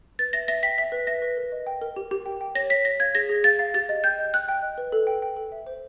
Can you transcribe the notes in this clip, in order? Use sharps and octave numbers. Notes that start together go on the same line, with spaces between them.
B4 A6
E5 A#6
E5 A#6
G5 B6
E5 B6
B4
E5 A#6
B4
A#4
D#5
G5
A#4
G4
G4
G5
G5
C#5 A#6
C#5 B6
C#5 A#6
F5 G#6
G#4 A#6
G#4
F5 A6
F5
G4 A6
D#5
G5 G6
D#5
G5 F#6
G5
D#5
B4
A4
G5
G5
A4
E5
C5